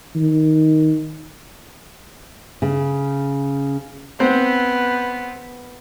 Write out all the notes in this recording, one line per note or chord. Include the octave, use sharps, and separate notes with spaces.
D#3
C#3
B3 C4 C5